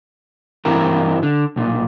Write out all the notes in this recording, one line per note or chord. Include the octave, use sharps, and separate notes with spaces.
G2 E3 C4 E4 G4 A#4
D3
B1 A#2